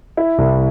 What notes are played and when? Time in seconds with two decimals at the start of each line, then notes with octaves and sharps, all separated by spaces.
0.17 E4
0.38 C2